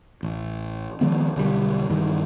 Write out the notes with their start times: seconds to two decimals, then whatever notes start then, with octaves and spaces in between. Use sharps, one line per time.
0.23 A1
1.01 D#3 F3 G#3 B3
1.36 B1 D3 G3
1.89 G2 D#3 E3